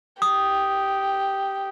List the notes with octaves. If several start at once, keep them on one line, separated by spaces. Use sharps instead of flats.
G4 D#6